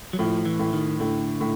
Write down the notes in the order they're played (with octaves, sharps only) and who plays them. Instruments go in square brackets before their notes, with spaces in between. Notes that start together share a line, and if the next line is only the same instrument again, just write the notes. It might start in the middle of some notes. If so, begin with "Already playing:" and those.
[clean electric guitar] F#3
[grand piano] A2 [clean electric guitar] F3
[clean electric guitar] E3
[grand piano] A2
[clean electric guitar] D#3
[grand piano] A2 [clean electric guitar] D3
[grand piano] A2